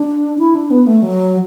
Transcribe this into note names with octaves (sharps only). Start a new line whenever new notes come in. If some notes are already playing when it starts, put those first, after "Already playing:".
Already playing: D4
E4
D4
B3
A3
F#3